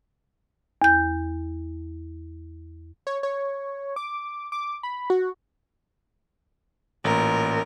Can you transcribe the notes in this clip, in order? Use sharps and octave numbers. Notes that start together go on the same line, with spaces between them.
E2 G6
C#5
C#5
D6
D6
B5
F#4
A1 A#2 A#4